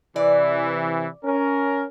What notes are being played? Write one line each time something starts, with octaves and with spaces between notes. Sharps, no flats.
C3 E3 D5
C#4 A#4